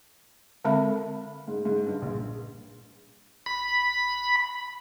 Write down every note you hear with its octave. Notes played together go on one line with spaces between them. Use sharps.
D3 G#3 C4 A4 E5 B5
G#2
G#2
G2
A#1
B5